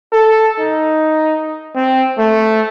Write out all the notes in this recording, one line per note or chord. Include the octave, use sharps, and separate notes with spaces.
A4
D#4
C4
A3